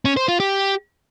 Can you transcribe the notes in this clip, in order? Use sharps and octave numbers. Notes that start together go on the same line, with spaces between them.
C#4
C5
F4
G4